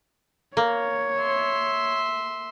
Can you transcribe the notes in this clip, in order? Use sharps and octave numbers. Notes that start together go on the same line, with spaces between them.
A#3 C#5
E5 C6